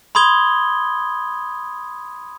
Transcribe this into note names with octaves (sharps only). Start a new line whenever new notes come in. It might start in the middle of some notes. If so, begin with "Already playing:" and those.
B5 C6 D#6 G#6 G7